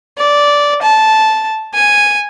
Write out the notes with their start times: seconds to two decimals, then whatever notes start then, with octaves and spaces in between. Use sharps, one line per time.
0.18 D5
0.82 A5
1.74 G#5